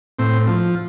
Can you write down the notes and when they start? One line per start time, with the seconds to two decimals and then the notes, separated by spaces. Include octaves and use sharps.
0.19 A2 C4
0.47 F3